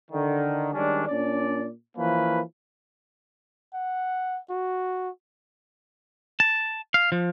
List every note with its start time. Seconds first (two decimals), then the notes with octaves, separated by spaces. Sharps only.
0.11 D3 D#3
0.74 D#3 G3 G#3 C#4 D4
1.08 A#2 C#4 D4 D5
1.97 E3 F3 A#3 C#4 E4 B4
3.74 F#5
4.50 F#4
6.40 A5
6.94 F5
7.12 F3